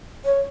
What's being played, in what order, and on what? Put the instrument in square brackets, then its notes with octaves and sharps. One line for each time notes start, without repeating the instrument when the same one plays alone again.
[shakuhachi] C#5